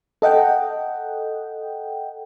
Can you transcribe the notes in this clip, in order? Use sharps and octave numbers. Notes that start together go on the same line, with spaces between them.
A4 D#5 F#5 G5